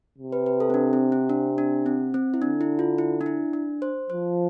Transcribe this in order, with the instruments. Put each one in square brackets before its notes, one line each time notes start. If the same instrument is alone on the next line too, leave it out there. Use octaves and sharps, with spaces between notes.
[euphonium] C3
[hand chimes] B4
B4
A4
C4
D4
C4
C4
D4
D4
C4
C4
E4
[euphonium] D3 [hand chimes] D4
[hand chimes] E4
F4
E4
D4
E4
D4
C5
[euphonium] F3 [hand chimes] C5